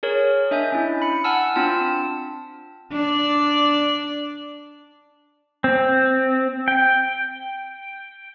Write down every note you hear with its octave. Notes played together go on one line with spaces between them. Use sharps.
G#4 A#4 C#5
D4 D#5 E5 G#5 G6
C#4 D4 E4
B5 C#7
F#5 G#5 A5 E6 F6
C4 D4 F4 A5
D4 D5
C4
G5